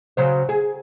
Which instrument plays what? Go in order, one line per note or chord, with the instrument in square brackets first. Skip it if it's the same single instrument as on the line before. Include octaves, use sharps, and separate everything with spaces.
[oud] C#3 F#3 C5
G#4